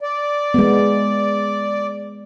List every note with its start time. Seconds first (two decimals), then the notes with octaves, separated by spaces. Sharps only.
0.01 D5
0.54 G#3 B3